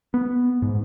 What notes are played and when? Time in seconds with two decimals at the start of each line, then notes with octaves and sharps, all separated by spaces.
0.14 B3
0.62 G#2